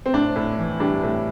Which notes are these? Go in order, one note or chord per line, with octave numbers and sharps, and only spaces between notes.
C4
A2 D4
A2
E3
G3 D4
A2